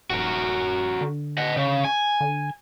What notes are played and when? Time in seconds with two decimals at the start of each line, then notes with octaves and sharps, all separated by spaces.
0.10 D#1 F#4 A#4
1.01 D3
1.38 D#5 F#5
1.56 C#3
1.85 G#5
2.21 D3